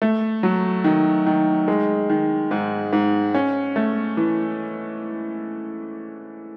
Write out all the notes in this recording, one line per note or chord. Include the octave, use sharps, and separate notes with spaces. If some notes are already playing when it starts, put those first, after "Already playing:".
A3
F#3
D#3
D#3
G#3
D#3
G#2
G#2
C#4
A3
E3